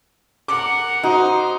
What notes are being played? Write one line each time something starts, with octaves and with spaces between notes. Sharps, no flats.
A#4 F#5 D6
D#4 F#4 C5 A#5